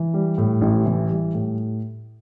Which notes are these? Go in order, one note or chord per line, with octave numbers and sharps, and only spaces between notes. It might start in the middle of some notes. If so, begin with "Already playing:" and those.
Already playing: E3
G3
A2
A1
E3
G3
A2